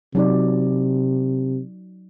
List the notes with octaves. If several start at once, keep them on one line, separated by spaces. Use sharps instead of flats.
C3 F#3 D#4 D5